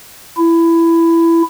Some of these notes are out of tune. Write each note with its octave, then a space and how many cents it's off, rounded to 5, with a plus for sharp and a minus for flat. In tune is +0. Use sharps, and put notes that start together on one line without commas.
E4 +15